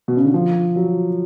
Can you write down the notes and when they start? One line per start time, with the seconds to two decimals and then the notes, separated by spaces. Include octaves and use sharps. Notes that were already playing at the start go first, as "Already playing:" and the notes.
0.08 B2
0.17 C#3
0.25 D3
0.34 F3
0.76 F#3